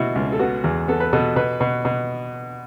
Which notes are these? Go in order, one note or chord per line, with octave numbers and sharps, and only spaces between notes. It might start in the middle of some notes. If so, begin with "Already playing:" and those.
Already playing: B2 A3 E4 F#4 A4
C#2
A4
B3 F#4
E2
B3 A4
B4
B2 A4
B2 B4
B2
B2